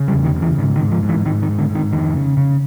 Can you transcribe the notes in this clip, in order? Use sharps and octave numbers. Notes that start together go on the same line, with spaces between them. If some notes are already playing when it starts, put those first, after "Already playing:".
Already playing: C#3
G3
E2
D#3
C#3
E3
G#2 D#3
D#3
G#2
F3
G#2
E3
G#2 D#3
D#3
G#2
D3
G#2
D#3
F2 D#3
C#3
C#3